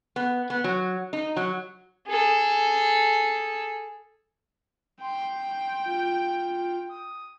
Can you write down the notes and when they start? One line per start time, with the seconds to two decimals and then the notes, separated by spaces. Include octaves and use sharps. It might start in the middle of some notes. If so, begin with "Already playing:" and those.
0.16 B3
0.50 B3
0.64 F#3
1.13 D#4
1.37 F#3
2.07 G#4 A4
5.01 G5 C6
5.85 F4
6.89 D#6